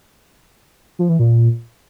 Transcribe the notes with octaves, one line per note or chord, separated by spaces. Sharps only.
F3
E3
A#2